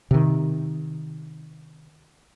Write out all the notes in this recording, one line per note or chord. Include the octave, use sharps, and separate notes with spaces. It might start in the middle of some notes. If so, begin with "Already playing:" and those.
C3 D#3